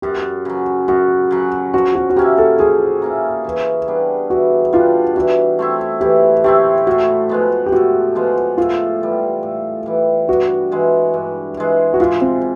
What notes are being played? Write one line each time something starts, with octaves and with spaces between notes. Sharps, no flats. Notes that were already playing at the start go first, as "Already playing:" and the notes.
F#2 G4
C#3 F#3
F#2 F#4
C#3 F#3
F3 F#4
F#4
F#4
A#3 C#4 E4 G4
A4
F3 G#4
A#3 C#4 E4
E3
G3 B3 D4
E3 F#4
G3 B3 D4 F4
E3 F#4
A3 C4 E4
E3 G4
A3 C4 E4 G4
A2 F#4
F3 G#3 B3
G4
A2 F#4
F3 G#3 B3
A2 F4
E3 G3
A2
E3 G3
G2 F#4
E3 G#3
G2
E3 G#3
F#4
G#2 F4
C4